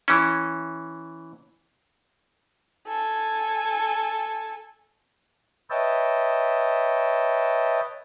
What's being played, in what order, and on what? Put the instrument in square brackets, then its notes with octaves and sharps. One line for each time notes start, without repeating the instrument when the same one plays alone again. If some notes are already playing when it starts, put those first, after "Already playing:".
[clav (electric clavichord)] E3 C#4
[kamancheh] A4 G#5
[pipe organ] B4 C#5 D#5 E5 G5 A5